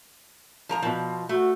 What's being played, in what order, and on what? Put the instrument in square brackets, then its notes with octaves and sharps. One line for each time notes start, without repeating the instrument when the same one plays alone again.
[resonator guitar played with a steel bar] F3 A#4 A#5
B2 F3
[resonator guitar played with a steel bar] A3 [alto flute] F#4